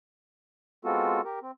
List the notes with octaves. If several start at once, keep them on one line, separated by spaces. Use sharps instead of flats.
G#3 B3 C4 F4 F#4 A4
G4 A#4
C4